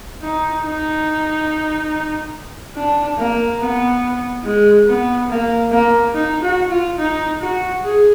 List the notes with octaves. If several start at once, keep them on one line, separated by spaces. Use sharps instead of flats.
D#4
D#4
D4
A#3
B3
G#3
B3
A#3
A#3
D#4
F#4
F4
D#4
F#4
G#4